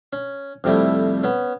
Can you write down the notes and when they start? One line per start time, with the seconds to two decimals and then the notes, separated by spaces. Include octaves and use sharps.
0.13 C#4
0.64 F2 C3 G3 A3 E4
1.24 B3 C#4